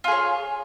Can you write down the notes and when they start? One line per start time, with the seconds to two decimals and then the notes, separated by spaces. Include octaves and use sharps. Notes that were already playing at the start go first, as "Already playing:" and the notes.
0.04 F4
0.08 G#4
0.12 C#5